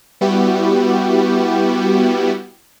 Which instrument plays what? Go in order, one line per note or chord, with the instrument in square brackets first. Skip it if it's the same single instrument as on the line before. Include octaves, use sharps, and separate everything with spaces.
[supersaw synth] G3 B3 E4 F#4 G4